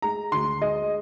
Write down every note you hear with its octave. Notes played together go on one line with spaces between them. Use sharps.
G#3 A#5
D2 C6
G#3 D#5